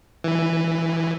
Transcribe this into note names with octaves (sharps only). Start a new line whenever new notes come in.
E3